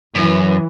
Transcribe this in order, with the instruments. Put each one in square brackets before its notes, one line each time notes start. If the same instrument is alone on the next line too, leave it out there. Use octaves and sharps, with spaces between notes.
[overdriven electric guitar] F#2 [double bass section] E3